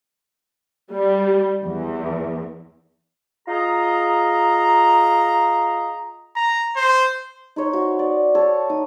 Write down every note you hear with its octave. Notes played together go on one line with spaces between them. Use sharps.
G3
E2
F4 G#4 D#5 A#5
A#5
C5
D#4 C5 C#5
F#4
D5
A4 C#5
D#4 D#6